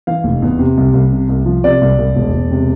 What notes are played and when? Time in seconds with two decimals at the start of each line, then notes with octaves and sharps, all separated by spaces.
0.07 E3 F5
0.24 F1
0.42 E2
0.59 C3
0.77 C2
0.94 C2
1.12 C3
1.29 C2
1.46 F3
1.64 C3 D5
1.81 C2
1.98 C2
2.16 E1
2.34 E1
2.51 C3